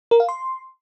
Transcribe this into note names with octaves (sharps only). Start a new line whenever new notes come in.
A#4
F5
C6